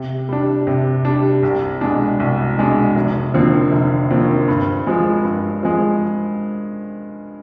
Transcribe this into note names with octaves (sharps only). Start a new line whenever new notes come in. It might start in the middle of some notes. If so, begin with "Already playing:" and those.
Already playing: C3
G3 D4
C3
G3 D4
C2
B2 G#3 D4
C2
B2 G#3 D4
F1
D#2 D3 F3 C4
F1
D#2 D3 F3 C4
G2
F3 G#3
G2
F3 G#3